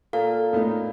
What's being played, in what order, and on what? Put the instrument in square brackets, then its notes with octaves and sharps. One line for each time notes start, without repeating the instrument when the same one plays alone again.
[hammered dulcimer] A#2 [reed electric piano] A4 [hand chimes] F5
[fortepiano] A2 B3 D#4